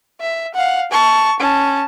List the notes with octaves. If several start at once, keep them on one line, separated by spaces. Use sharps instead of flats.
E5
F5 F#5
A5 C#6
C#4 A5